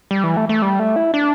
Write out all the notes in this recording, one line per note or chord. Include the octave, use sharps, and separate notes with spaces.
G3
E3
A3
A3
G3
A3
E4
D4